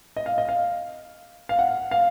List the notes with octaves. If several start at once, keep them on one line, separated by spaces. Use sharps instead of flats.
D#5
F5
D#5
F5
F5
F#5
F5